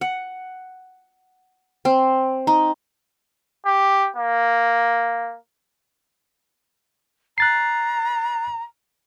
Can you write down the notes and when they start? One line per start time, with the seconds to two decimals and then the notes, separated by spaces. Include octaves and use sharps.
0.01 F#5
1.85 C4
2.47 D#4
3.66 G4
4.16 A#3
7.38 A#5 F#6 A6 C7